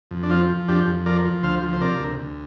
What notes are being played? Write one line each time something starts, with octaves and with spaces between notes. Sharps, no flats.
F2
D4
F3 C4 F4
F3
F2 D4 G4
F2
F3 A#4 D5
F3
D2 C5 F5
F3
C5
C3 A#4 D5
D2
D2